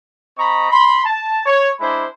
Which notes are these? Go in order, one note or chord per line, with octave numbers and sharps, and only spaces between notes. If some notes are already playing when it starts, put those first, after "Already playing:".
C4 D#5 A#5 B5 C#6
B5 C6
A5
C#5
G#3 D4 E4 C5 B5